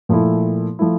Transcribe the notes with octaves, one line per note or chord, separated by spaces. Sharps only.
A#2 F3 A3 E4
F3 A3 E4